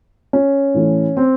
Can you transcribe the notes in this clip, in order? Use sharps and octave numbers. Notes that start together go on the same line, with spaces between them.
C#4
A2 E3 A3
C4